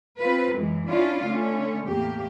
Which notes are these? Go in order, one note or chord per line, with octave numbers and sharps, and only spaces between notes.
C4 F4 B4
F#2 E3 G#3
C#4 D4 E4 F4
D3 A3 C#4
E2 A2 A#3 G4